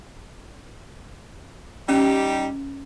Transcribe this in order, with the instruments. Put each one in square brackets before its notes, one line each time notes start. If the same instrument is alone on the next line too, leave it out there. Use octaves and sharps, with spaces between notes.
[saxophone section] G3 D#4 G4 [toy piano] C#4